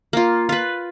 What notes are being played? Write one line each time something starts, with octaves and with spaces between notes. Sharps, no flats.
A#3 F4
F4 B4